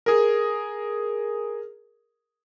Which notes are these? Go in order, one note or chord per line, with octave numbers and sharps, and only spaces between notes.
G#4 A#4